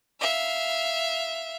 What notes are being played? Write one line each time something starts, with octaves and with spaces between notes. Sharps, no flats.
E5 F5